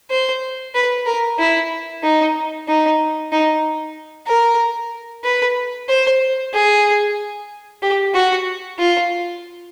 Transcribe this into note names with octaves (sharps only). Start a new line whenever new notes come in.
C5
B4
A#4
E4
D#4
D#4
D#4
A#4
B4
C5
G#4
G4
F#4
F4